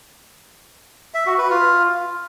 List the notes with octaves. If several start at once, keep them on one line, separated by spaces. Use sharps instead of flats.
E5
F#4
B4
F4